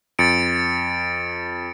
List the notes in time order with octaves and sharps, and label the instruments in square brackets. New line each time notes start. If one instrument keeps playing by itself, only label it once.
[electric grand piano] F2 [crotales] A6 C#7 D7